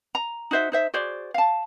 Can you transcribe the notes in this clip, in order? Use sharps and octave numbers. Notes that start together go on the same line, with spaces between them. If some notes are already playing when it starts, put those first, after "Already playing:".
A#5
D#4 F#4 C5 E5
D#4 C5 E5
F#4 G#4 C5 D5
F5 A5